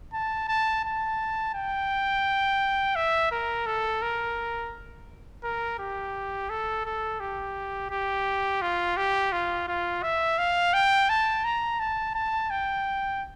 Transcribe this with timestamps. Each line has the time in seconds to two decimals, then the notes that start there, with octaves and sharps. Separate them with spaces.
0.13 A5
0.48 A5
0.84 A5
1.54 G5
2.96 E5
3.31 A#4
3.66 A4
4.02 A#4
5.43 A#4
5.79 G4
6.50 A4
6.85 A4
7.20 G4
7.91 G4
8.62 F4
8.97 G4
9.32 F4
9.68 F4
10.03 E5
10.38 F5
10.74 G5
11.09 A5
11.44 A#5
11.80 A5
12.15 A5
12.50 G5